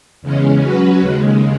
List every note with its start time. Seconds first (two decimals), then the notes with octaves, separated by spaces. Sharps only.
0.22 E2 C#3 G#3 C#4
0.62 F#3 C#4 F#4 B4
1.01 D#2 C#3 G#3